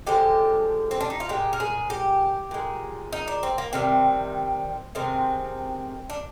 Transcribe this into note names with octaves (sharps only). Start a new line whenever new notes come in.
D3 F3 G#3 G4
C4
D4
D#4
F4
A#2 G#3 G4
A#4
G#4
G4
A#2 G#3
D#4
D4
C4
A#3
C3 D#3 G3 C4
C3 D#3 G#3 C4
D4